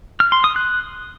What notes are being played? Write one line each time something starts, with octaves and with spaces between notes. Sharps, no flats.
F6
C6
D#6
F#6